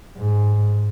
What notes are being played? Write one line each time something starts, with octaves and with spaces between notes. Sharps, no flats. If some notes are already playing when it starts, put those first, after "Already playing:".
G#2